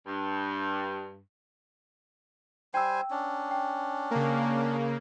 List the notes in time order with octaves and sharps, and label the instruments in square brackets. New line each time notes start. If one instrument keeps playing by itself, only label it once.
[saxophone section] G2
[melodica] G3 C5 G#5 [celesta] G5 E6
[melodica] C#4 D4
[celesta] G5
[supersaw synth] C#3 A#3